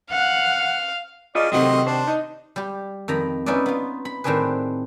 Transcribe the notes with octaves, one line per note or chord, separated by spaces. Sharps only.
F5 F#5
F4 G#4 D5 D#5
C3 D#3 F#3 A3 C4 D#5 F#5 C6
D4 C5
D#4
G3 G4
F2 D#3 A#5 B5
B3 C#4 D#4 E4 B4 D5
B3 F4
B5
A2 D#3 C4 D4 G#4 B4